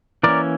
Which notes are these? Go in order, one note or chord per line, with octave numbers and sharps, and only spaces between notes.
E3 A#3 C#4 A#4 D5